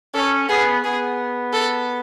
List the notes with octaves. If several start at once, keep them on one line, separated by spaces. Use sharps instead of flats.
C#4 A4
B3 G#4
B3 G#4
A4